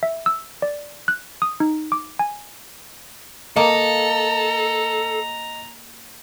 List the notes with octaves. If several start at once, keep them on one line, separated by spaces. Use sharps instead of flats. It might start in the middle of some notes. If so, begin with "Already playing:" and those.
E5
E6
D5
F#6
D#6
D#4
D6
G#5
A#3 A4 D#5 A#5